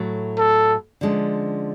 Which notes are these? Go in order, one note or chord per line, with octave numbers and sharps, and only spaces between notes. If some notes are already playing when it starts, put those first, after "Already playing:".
Already playing: A2 F#3 A3
A4
D3 F3 G#3 C#4